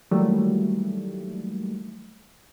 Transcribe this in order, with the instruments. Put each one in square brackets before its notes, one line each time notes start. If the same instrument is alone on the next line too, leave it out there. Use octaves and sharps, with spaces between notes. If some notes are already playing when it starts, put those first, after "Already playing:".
[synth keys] D#3 E3 F#3 G3 A3 A#3